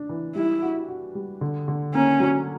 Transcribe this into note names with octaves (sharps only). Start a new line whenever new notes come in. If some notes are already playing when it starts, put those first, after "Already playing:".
Already playing: D4
E3
G3 E4
F#4
F#4
G3
D3
D3
A#3 C#4
F#3